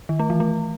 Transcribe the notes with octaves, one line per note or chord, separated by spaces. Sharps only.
D#3
A3
E3
A3